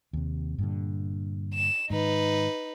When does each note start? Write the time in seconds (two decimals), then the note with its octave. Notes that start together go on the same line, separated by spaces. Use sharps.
0.13 D#2 C3
0.58 G2 A#2 D3
1.55 E7
1.90 G#2 D#3 D#4 B4